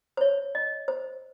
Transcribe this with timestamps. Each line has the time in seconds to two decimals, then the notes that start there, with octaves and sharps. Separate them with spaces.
0.17 C5
0.21 C#5
0.55 D#5
0.88 C5